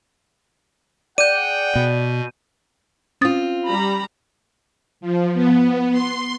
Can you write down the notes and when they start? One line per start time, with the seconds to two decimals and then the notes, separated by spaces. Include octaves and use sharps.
1.18 G#4 D5 F#5 G5 G6 D#7
1.76 B2
3.21 C4 C#4 F4 D#6 A6
3.66 G3 A#5 B5
5.01 F3
5.34 B3
5.91 C6